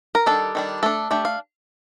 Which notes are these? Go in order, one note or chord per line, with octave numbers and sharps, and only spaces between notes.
A#4
D#3 G3 D4 A4
D#3 G3 D4
A3 D4 A4
A3 D4 G4
F5